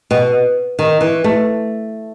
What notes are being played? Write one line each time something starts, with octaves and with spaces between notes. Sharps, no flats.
B2
D#3
E3
A3